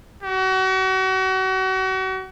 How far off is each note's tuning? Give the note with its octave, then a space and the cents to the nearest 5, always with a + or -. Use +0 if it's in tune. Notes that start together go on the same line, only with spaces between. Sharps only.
F#4 +35